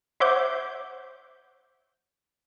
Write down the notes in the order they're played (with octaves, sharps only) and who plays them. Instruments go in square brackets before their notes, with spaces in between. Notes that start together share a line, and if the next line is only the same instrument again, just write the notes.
[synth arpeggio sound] C5 C#5 E5 F#5 D6 G6